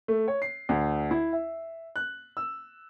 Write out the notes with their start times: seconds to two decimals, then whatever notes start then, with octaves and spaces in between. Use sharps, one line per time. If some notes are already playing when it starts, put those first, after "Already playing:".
0.08 A3
0.28 C#5
0.42 C7
0.69 D2
1.11 E4
1.33 E5
1.96 F#6
2.37 E6